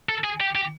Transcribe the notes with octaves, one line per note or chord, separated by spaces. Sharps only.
A4
G#4
G4
G4